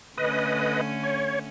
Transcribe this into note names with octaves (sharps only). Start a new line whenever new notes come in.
D3 A3 C#4 B4 D#5
C#5